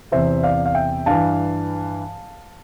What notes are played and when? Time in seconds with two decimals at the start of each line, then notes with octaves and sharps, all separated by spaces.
0.12 E2 C3 E3 C5 E5
0.43 D5 F5
0.66 F5
0.75 E5 G5
1.06 G2 E3 F5 A5